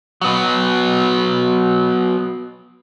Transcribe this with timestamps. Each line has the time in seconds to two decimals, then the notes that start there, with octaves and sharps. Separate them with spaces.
0.21 F#3 B3